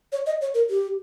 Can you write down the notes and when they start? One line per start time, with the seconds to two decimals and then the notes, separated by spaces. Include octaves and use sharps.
0.12 C#5
0.26 D#5
0.41 C#5
0.54 A#4
0.70 G4